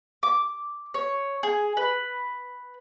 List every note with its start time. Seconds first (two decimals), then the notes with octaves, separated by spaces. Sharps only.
0.23 D6
0.94 C#5
1.43 G#4
1.77 B4